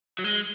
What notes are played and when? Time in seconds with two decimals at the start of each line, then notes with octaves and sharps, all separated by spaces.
0.19 F#3
0.24 G#3